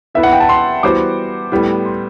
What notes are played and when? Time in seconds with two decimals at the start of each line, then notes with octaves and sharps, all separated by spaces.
0.15 E3 B3 E4 B4 E5
0.23 F#5
0.32 G5
0.40 A5
0.49 C6
0.83 E3 G3 B3 F#4 C5 D6
1.52 A2 G3 B3
1.85 C6